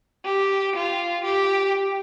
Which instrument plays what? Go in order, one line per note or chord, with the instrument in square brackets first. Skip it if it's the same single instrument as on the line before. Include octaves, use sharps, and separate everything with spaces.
[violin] G4
F4
G4